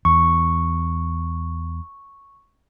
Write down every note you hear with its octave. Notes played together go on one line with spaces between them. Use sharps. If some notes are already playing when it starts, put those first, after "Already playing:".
E2 C#6